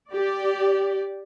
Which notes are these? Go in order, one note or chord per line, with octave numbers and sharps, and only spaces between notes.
G4 D5